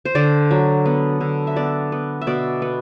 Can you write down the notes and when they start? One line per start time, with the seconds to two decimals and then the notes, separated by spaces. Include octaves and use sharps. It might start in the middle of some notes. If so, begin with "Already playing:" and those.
0.05 C5
0.15 D3 D5
0.51 F#3
0.86 B3
1.21 D3
1.47 E5
1.56 B3 D5
1.92 B3
2.21 E5
2.27 B2 D5
2.62 B3